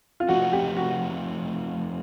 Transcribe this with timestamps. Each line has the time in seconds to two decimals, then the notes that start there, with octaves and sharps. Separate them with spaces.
0.20 F4
0.28 F3 A3 C4 D#4 F#4
0.53 G4
0.77 F#4